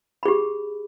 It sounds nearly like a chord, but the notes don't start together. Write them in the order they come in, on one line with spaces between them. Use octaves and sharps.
B5 G#4 G4